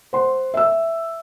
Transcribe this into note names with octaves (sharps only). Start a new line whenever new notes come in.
C5 F#5 C6
E5 E6